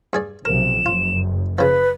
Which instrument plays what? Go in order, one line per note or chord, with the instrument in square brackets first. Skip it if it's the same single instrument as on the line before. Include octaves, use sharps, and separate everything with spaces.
[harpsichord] G2 G#4 D5
[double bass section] B1 C3 F3 [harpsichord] A#4 [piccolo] E7
[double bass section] F#1 F#2 [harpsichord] F4
[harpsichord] C#3 F3 [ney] B4 [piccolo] B5